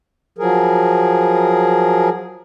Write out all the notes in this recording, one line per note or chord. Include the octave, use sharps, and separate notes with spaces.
F3 F#3 G#4 A#4